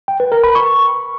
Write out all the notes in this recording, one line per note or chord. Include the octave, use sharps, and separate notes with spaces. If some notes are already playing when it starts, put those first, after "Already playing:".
G5
B4
A#4
B5
C#6